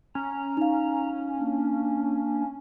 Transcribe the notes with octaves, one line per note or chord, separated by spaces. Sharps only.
C#4 A#5
D#4 F5
A#3 D4